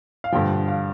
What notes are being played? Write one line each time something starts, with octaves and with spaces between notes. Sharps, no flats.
F5
G2 D3 F3 G5
F5